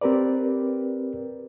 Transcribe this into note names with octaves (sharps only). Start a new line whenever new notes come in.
C4 G4 A#4 B4 D5